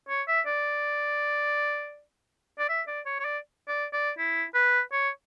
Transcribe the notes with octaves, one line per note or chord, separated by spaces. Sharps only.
C#5
E5
D5
D5
E5
D5
C#5
C#5
D5
D5
D5
E4
B4
C#5